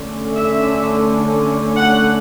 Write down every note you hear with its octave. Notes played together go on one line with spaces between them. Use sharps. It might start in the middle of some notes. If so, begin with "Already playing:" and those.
Already playing: D3 A3 C#4
E5
F#5